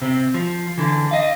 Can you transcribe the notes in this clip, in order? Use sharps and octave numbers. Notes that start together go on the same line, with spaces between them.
C3 C4
F3
D3 E3
D#5 F5